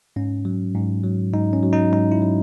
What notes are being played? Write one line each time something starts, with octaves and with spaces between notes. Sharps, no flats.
G#2 C#4
F#3
G#2
F#3
G#2 D#4
C#4
F#3
D#4
G#2 D#4
E4
F#3